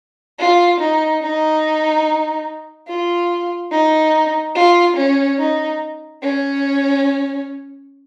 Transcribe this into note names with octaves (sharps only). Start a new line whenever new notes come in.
F4
D#4
D#4
F4
D#4
F4
C#4
D#4
C#4